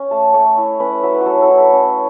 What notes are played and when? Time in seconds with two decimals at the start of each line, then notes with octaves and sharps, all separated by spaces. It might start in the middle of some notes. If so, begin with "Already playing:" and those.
Already playing: C#4
0.11 A3 A5
0.34 A3 C#5
0.57 E4
0.80 C#4 B4
1.03 F#3 E5
1.14 B4
1.21 F#3 F#4 A4
1.41 A4
1.50 E4
1.57 A4
1.73 C#4